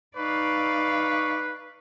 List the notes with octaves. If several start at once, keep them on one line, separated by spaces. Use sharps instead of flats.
D#4 B4 D5 F5 C#6